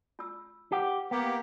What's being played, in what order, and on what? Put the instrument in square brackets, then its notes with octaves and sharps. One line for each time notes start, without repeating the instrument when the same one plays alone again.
[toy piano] F4 E6
[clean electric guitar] G4 [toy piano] B4 F#5 G5
[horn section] A#3 G4 [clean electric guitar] B3